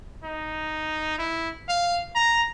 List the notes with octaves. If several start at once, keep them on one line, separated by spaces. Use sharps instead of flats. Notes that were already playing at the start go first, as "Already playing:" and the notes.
D#4
E4
F5
A#5